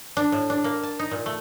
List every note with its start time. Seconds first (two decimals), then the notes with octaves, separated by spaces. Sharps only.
0.17 D4
0.32 A2
0.50 D4
0.64 A#3
0.83 A5
0.99 D#4
1.11 A#2
1.26 A3